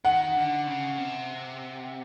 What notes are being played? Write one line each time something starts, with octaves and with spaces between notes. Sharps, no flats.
D#3 F#5
D3
C#3
C3